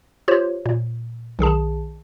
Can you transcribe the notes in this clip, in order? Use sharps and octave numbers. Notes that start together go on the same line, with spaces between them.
F4 G4 C5 C#5
A#2
B1 D#3 G#4 A5